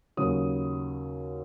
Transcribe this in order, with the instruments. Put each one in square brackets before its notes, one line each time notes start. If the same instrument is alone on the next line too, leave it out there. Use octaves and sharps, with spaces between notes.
[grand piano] D#2 C#3 F#3 D#6